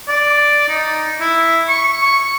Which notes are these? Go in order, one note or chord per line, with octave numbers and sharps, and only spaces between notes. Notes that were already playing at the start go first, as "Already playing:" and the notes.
D5
D#4
E4
C#6
C#6